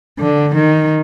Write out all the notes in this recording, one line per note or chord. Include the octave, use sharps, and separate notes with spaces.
D3
D#3